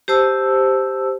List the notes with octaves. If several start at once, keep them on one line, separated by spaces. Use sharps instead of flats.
G4 C5 A5 E6